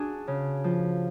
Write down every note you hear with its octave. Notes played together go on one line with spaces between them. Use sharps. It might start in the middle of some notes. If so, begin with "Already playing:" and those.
Already playing: D4 F#4 G#4
C#3
F3